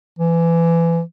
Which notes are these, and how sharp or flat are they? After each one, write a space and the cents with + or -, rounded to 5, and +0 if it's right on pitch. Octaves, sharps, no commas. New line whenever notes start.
E3 +25